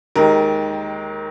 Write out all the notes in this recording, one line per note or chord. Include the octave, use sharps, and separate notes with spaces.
D#2 D#3 G#3 A#4